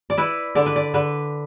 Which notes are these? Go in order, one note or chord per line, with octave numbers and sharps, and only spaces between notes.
D5
E4 B4
D3 D5
B4
D5
D3 B4